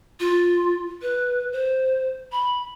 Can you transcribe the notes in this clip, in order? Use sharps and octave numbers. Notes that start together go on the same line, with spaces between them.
F4
B4
C5
B5